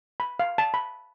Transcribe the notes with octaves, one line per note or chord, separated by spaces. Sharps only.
B5
F5
A5
B5